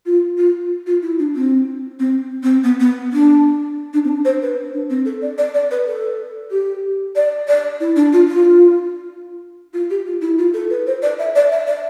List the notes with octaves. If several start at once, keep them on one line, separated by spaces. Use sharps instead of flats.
F4
F4
F4
E4
D4
C4
C4
C4
B3
B3
D4
D4
C4
D4
C5
B4
D4
C4
A4
D5
D5
D5
B4
A4
G4
D5
D5
E4
D4
F4
F4
F4
G4
F4
E4
F4
A4
B4
C5
D5
E5
D5
E5
D5